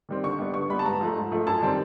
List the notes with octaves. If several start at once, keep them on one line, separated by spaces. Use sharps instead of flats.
D#3 G3 C4
D3 C#6
G3 B3
D3 C#6
G3 B3 B5
A5
G#2 A#5
F3 A3
G#2
F3 A3
F#2 A5
D#3 G3 C4